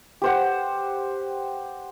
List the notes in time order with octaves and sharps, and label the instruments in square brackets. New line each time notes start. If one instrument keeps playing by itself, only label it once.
[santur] G4 C5 F#5